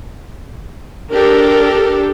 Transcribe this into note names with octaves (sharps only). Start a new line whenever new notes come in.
D4 G4 A4 A#4